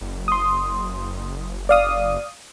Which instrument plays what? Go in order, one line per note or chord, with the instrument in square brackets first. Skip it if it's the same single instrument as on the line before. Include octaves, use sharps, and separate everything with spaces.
[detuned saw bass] F#1
[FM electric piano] C6 D#6
D5 F5 D#6